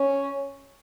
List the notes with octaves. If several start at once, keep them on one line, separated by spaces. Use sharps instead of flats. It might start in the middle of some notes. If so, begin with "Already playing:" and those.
Already playing: C#4